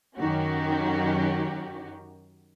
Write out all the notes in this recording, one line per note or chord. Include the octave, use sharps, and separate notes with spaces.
F#2 D#3 C#4 F#4 G4